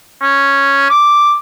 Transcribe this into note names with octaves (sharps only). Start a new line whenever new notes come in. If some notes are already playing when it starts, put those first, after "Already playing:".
C#4
D6